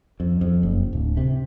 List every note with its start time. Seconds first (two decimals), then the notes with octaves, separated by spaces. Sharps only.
0.20 F2
0.41 F2
0.63 F#1
0.93 D1
1.17 C3